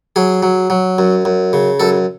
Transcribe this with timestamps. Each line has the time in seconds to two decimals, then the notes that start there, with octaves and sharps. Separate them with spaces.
0.16 F#3 G#4
0.43 F#3
0.70 F#3
0.99 F#2
1.25 F#2
1.53 C#3
1.80 F#2 A4